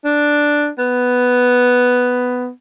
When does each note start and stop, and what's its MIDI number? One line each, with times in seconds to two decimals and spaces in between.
0.04 0.69 62
0.78 2.49 59